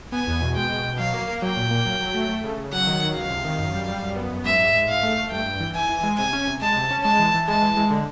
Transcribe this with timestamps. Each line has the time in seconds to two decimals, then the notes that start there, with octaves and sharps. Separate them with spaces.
0.12 B3 G#5
0.27 E2
0.41 B2
0.56 G#3 G5
0.70 B2
0.85 B2
0.99 F#3 F5
1.14 A#3
1.28 A#3
1.42 F#3 G5
1.57 A#2
1.71 A#3
1.86 F#3
2.00 F#3
2.14 A3
2.29 A3
2.44 C#3
2.57 C#3
2.73 F#3 F#5
2.87 D#3
3.01 F#3
3.15 C#2 F5
3.30 C3
3.44 D#3
3.59 F#2
3.73 G3
3.87 G3
4.02 F#2
4.16 B3
4.31 F#2
4.45 G#2 E5
4.59 G#2
4.75 G#2
4.89 G#2 F5
5.03 A3
5.18 A3
5.31 G2 G5
5.45 G2
5.60 E3
5.75 E3 G#5
5.89 E3
6.03 G#3
6.18 C3 G#5
6.33 C#4
6.47 C3
6.61 G#3 A5
6.76 C3
6.90 C#4
7.04 G#3 A5
7.19 E3
7.34 E3
7.48 G#3 A5
7.62 E3
7.77 G#3
7.90 D3